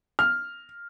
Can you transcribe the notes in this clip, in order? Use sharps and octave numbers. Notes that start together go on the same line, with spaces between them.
F6